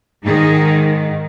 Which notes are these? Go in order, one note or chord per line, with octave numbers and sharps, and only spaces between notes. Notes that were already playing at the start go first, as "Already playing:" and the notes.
G#2 D#3 D#4 G#4